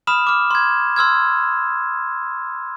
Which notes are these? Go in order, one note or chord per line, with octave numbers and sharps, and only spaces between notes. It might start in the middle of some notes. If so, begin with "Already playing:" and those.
B5 D#6 F6 E7
D6 F6
C6 G#6
C6 E6 F6 G#6